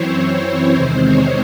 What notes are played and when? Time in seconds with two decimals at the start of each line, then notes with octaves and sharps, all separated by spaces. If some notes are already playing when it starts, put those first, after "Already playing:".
Already playing: F#2 E3 C4 E4 C5 C#5
0.16 C#5
0.74 E2 C3 D#3 G#3 C4 C5
1.04 C#5